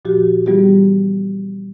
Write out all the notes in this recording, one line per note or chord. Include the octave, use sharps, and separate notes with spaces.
A#2 F3 F#4 G4
E3 G3 B3 F4 G4 G#4